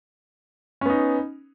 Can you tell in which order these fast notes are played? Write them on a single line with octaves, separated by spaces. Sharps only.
C#4 B3 D#4